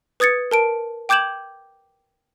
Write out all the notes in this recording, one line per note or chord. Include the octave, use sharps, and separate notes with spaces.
B4 D#6 G#6 A6 C#7
A#4 A5 D7
G5 D6 G6 G#6 E7 F#7